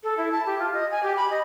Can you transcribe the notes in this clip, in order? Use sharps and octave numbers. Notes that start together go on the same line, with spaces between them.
A4
E4
A5
G4
F4
D#5
G#5
G4
B5
D#5